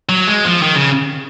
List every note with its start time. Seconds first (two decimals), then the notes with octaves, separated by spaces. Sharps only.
0.09 F#3
0.27 G#3
0.44 F3
0.62 D#3
0.75 C#3